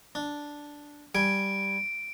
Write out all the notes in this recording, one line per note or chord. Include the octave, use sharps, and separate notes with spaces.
D4
G3 G#5 D7